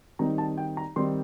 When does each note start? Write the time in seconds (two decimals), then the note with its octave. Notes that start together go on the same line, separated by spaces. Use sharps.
0.19 D#3 G3 C4 D#4 A#5
0.38 A5
0.58 G5
0.77 A#5
0.96 D#3 G3 C4 D#4 C6